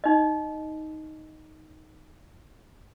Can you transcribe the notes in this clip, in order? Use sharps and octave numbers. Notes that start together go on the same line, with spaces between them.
D#4 D#5